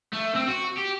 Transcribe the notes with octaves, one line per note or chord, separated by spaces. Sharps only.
A3
C4
F#4
G4